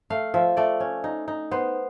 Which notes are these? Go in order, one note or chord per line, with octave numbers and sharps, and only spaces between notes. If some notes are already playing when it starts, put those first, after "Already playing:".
A3 F5
F3 E5
A3 D5
C#4
D#4
D#4
B3 C5